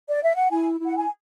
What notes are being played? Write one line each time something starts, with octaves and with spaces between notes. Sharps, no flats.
D5
E5
F#5
E4 G#5
E4
F#5
G#5